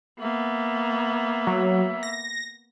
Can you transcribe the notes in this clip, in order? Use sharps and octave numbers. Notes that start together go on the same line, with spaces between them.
A#3 B3 E5
F#3
A#6